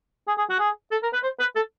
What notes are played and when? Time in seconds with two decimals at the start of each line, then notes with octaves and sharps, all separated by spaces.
0.28 G#4
0.38 G#4
0.50 F#4
0.59 G#4
0.91 A4
1.03 A#4
1.13 B4
1.23 C5
1.40 B4
1.56 A4